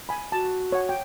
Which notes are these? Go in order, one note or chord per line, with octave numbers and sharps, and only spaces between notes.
G#5 B5
F#4 A5
C#5 F#5
G5